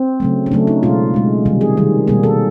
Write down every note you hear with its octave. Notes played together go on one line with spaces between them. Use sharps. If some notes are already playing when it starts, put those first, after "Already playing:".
Already playing: C4
C#3 F#3 A3
C#4
C#3 F#3 A3 D4
D#4
B2 G#3 F4
B2 G#3
C3 D#3 G3
G#4
C3 D#3 G3
B2 G3 A#3 G#4
A4